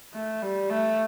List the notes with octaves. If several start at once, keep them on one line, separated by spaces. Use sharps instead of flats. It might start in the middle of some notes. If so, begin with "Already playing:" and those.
A3
G3
A3